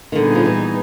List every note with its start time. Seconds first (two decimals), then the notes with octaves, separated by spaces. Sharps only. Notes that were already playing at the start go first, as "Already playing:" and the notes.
0.12 D#3
0.15 A#2 D3 G3 B3 D#4 G#4
0.35 F3
0.45 E3